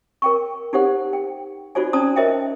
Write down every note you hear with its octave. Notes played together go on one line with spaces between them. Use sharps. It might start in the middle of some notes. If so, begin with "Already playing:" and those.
A#4 G5 C#6
D#4 G4 C5 F#5
G5
D#4 F4 F#4 C5 D5 G#5
C#4 C5 D5 A5 A#5 D#6
A#4 C5 D#5 E5 G5